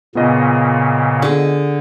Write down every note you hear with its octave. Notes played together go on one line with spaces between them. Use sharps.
A#2 C#3 B3 F4 D#5
D3 G#4